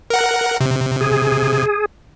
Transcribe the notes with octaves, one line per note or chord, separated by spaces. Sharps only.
A#4 F#5
C3
G#4